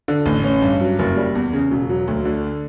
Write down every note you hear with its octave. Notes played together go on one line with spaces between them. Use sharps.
D3
A1
C#4
G2
F#3
F#1
G3
E2
C#3
E1
F#3
D2
D3